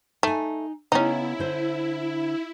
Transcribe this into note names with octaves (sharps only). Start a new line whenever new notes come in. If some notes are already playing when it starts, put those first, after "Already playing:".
A3 D#4 G#5
C#3 B3 C#4 D#4 E4
D3 C5